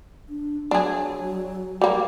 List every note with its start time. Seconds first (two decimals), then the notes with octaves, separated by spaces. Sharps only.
0.29 D4
0.71 F#3 D4 G#4
1.81 G3 A#3